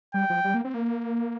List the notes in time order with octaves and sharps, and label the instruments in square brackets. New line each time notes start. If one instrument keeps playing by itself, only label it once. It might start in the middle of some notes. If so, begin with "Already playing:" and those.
[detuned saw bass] G3 [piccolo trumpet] G5
[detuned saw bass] F3
G3
A#3
C4
A#3